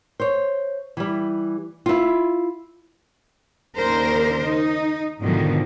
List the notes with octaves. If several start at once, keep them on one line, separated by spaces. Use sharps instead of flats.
C5 C#5
E3 G3
E4 F4
D#2 C#3 D4 A#4 C5
D#4
G#2 B2 D3 D#3 F3 G3